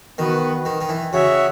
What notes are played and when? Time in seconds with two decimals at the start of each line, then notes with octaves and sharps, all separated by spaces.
0.18 D#3 B3 F#4 B4
0.65 D#3
0.81 D#3
0.89 E3
1.13 C#3 F#4 C#5 E5